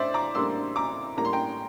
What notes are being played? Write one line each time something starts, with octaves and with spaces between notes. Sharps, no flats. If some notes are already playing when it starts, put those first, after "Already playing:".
Already playing: A2 D4 C5 D5 E5
A#5 D6
A2 G3 A#3 D4 C6 E6
A#5 D6
A2 G3 A#3 A#5
C6
G5 A#5